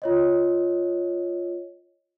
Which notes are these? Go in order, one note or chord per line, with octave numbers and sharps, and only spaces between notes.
F4 C#5 D#5